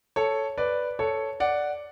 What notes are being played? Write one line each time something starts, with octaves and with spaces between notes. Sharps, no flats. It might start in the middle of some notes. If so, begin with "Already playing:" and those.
A4 C#5
B4 D5
A4 C#5
D5 F#5